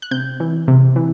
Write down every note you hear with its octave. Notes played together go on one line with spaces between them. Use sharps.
F#6
C3 G6
E3
C3
E3